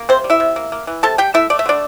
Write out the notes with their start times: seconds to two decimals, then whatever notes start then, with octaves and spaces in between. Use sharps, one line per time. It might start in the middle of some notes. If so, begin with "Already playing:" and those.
Already playing: A#3
0.09 C3 C4 C5
0.24 G3
0.30 E4 E5
0.40 C3
0.56 A#3
0.72 A#3
0.87 E3
1.03 C3 A4 A5
1.18 G3 G4 G5
1.34 A3 E4 E5
1.50 A3 D5
1.59 E5
1.66 D3 D4 D5